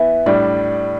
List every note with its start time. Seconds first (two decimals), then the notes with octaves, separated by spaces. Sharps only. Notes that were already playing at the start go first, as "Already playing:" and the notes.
Already playing: E3 B3 E5
0.26 A2 G3 D4 D5